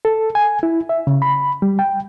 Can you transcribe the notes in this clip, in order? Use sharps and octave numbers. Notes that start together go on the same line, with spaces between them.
A4
G#5
E4
E5
C#3
B5
G3
G5